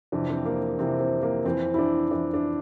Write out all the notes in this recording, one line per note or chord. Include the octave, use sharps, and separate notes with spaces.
F2 C3 E3 D4
C4
A#3
F2 C3 E3 C4
C4
A#3
F2 E3 C4
E4
D4
F2 E3 D4
D4